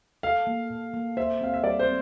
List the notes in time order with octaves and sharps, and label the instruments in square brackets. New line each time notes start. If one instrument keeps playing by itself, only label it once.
[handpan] A4 [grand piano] F5
[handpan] A#3
A#2
A#3
[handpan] C5 [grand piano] E5
[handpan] C4 [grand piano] F5
[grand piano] E5
[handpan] G3 [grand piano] D5
[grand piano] C5
[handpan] C4